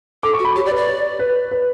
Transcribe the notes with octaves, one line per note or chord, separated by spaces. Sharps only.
A4 D6
C#6
F#4
B5
G4 C#5
D5
B4
D5
C#5
B4
B4